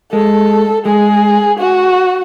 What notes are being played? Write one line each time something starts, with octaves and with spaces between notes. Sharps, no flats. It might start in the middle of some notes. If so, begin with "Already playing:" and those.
G#3 A4
G#3 G#4
F#4